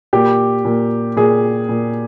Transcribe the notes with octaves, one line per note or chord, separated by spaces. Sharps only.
A#2 G4
A#2
A#2 G#4
A#2